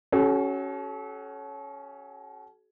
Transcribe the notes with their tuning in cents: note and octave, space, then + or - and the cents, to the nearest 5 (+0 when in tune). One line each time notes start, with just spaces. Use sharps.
C#4 +0 F#4 +30 A4 -35